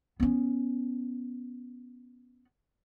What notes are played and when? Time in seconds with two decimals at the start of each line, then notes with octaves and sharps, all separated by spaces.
0.20 B3 C#4